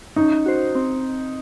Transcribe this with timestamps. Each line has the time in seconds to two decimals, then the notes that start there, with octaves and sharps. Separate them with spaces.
0.16 C#4 D#4
0.46 F#4 C5
0.75 C4